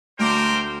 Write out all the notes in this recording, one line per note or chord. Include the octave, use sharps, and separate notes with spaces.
D2 A3 A#4 C5 G5 D6